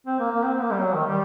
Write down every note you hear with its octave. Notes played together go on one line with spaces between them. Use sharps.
C4
A#3
A#3
C4
C4
A#3
G3
F#3
D#3
G3